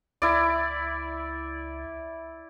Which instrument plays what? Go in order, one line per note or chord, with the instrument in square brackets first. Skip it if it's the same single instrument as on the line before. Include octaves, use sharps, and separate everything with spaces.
[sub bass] C#2 [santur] E4 D5